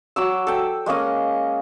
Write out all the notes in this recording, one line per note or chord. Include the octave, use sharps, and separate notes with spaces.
F#3 D6 E6
A4 G5
G#3 A#3 C#4 D#5